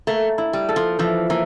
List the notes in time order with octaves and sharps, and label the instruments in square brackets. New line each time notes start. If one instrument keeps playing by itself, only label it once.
[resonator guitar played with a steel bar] A3 [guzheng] A#3
[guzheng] E4
[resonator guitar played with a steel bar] G3
[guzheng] A4
[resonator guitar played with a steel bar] F3
[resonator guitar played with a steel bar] E3 [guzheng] F3
[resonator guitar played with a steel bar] E3 [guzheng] A#3